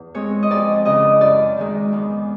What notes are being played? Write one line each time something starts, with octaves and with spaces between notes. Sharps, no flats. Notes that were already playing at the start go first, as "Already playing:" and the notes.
Already playing: E2
G#3 C4 C#5
D#5
F2 D5
C#3 E3 D#5
F#2 D5
D#3 G#3
E2